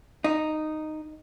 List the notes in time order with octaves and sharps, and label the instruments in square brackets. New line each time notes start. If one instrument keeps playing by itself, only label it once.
[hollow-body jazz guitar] D#4